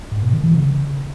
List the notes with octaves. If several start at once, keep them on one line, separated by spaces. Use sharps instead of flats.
G#2
B2
D#3
E3
C#3